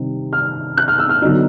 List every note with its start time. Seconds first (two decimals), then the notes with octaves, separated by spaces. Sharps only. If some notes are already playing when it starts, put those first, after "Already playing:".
Already playing: C3 D#3 G3 C4
0.33 F6
0.77 F#6
0.88 F6
0.99 E6
1.09 F6
1.22 D3 F#3 B3 D#4